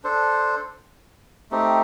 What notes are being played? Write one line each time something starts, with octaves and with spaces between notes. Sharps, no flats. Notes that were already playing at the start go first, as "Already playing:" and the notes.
D4 A4 C5
A3 C4 D#4 G4